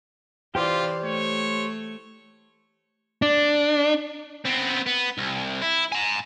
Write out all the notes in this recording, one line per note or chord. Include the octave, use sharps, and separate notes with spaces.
E3 F4 G4 C5 D5 D6
A3 C#5
D4
B3 C4
B3
C2
E4
G#5 A#5